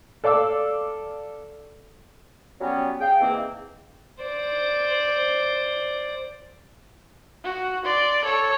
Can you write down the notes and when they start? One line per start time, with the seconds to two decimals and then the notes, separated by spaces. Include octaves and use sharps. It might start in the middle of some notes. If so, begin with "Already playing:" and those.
0.24 A4 D5 F5 D6 E6
2.61 F#3 G3 B3 C#4
3.00 G#4 F5 G5
3.20 E2 G#2 A#3 C4
4.24 C5 D5
7.44 F#4
7.85 D5 C6
8.24 A4 C#5